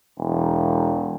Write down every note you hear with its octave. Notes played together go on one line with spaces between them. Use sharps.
E1